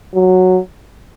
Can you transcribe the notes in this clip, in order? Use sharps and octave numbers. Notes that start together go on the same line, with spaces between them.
F#3